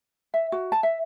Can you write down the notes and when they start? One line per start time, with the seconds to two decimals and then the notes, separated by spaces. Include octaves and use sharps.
0.34 E5
0.52 F#4
0.72 A5
0.83 E5